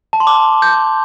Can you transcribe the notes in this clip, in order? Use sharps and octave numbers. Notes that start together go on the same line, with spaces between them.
A5
C6
D6
G6